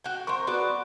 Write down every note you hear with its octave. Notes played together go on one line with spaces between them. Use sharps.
F#4 G5
C4 A#4 C6 C#6
B3 F#4 D5